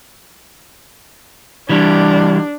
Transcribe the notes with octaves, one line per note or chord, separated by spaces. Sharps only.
E3 G3 D4